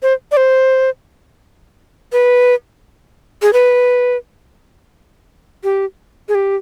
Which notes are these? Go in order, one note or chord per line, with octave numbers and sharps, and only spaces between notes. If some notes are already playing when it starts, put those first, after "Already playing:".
C5
D5
C5
B4
G#4
B4
G4
G#4
G4